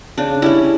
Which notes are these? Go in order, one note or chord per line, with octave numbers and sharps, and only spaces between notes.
C#3 D4
G3 C#4 E4